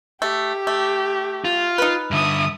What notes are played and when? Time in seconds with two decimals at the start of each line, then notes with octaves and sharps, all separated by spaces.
0.22 A3 G4
0.67 A3
1.45 F4
1.78 D#4 B4
2.11 G2 D3 E5 D#6